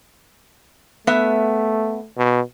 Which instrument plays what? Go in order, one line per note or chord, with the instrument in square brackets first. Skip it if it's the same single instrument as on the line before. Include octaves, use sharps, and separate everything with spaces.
[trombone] A3 [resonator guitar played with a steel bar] B3 E5
[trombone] B2